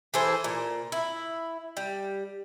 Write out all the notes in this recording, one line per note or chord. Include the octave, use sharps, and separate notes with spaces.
E3 G#4 A4 C5
A#2
E4
G3